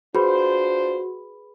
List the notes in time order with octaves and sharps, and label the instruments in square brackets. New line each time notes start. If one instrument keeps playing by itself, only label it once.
[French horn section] D4 F4 C5 [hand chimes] F#4 [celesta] G#4 B4 B5